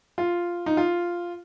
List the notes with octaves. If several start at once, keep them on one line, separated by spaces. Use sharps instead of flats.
F4
D#4
F4